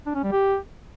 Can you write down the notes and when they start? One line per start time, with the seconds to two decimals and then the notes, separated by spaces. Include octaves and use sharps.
0.06 D4
0.15 C#4
0.23 G3
0.32 G4